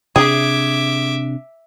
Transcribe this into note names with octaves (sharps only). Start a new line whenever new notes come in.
C3 D4 G#4 E5 D6